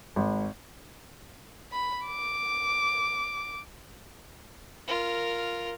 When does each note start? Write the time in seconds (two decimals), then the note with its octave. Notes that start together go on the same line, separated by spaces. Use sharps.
0.16 G#1
1.72 B5
2.07 D6
4.88 F4 A#4